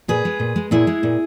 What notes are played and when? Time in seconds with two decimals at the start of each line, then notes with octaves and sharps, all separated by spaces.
0.08 A#2 G#4 B4
0.25 G#3
0.40 A#2
0.56 G#3
0.71 A#2 E4 G#4
0.87 G#3
1.03 A#2